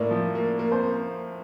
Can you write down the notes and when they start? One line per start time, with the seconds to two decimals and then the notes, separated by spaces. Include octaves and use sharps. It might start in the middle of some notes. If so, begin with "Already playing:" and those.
Already playing: A2 A#3 D5
0.10 F3
0.35 A#3
0.59 A#3
0.71 C5